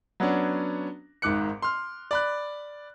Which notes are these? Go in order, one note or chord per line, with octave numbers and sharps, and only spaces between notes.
F#3 B3 C#4 D4
G#1 G#2 D#3 D6 F#6 C#7
C6 F6
D5 B5 F#6